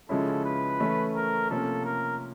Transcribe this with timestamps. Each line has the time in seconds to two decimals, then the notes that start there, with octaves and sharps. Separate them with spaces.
0.09 C#3 F3 G#3 C#4 E4 A4
0.45 B4
0.80 E3 A3 C#4
1.15 A#4
1.50 C3 F3 A#3 C#4 A4
1.85 A#4